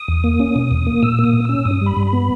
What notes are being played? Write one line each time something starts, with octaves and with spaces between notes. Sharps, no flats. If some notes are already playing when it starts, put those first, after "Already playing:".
Already playing: D#6
E2
A#3
C#4
B2
E2
A#3
A#2 E6
A#3
D#6
A#2
C#4 E6
G2 D#6
G3
B5
G2
B5
B3